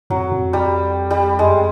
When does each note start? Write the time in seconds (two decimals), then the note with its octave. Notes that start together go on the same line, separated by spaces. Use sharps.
0.10 F2 F#3
0.32 F2
0.53 G3
1.11 G3
1.39 F#2 G#3